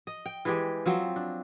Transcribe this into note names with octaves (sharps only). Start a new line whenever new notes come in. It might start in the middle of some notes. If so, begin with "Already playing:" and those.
D#5
G5
E3 G#3 G4
F3 F#3 C4
D4